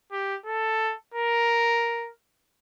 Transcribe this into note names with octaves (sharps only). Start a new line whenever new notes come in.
G4
A4
A#4